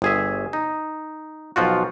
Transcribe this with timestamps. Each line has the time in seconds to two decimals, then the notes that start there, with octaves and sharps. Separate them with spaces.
0.02 G1 G#4 E5
0.53 D#4
1.56 B1 F3 F4 F#4